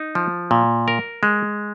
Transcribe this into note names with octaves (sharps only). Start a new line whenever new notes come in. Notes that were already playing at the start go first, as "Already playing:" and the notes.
Already playing: D#4
F3
A#2
A#4
G#3